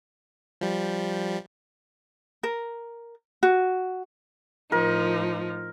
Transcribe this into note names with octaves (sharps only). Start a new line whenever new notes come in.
F3 G3
A#4
F#4
A2 F3 D#4 A#4